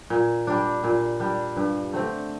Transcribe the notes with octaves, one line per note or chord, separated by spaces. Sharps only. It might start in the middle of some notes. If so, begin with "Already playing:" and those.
A#2
G3 D4
A#2
G3 D4
G2
D3 A3 C4